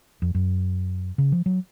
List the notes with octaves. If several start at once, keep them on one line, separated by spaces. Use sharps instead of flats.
F2
F#2
C#3
F3
F#3